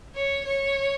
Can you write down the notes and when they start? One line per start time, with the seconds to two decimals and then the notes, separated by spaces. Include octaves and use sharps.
0.14 C#5
0.45 C#5